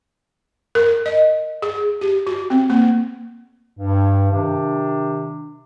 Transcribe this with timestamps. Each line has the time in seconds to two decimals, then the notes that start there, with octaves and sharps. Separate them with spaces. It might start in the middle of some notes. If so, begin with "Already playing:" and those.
0.75 A#4
1.06 D#5
1.62 G#4
2.01 G4
2.27 F#4
2.50 C4
2.70 A#3
3.77 G2
4.31 C3 D#3 D4